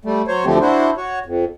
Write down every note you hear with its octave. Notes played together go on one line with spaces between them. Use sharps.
G3 A3
F#3 C5 C#5
D2 D3 F3 A3 C4 G4
D4 E4 F#4 C5
F#4 C#5
F2